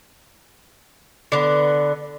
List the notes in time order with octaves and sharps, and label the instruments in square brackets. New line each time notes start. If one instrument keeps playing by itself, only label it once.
[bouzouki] D3 B3